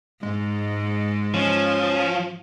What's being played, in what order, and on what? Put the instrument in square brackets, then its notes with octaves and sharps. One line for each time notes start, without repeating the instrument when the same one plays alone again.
[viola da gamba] G#2 [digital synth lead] G#3
[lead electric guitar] F3 [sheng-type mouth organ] C#4